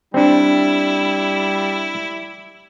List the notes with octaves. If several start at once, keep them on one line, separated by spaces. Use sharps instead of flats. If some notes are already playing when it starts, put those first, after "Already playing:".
G3 C4 D4 E4